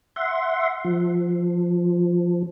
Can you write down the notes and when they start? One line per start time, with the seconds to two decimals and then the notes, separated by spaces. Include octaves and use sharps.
0.16 E5 F#5 C6
0.85 F3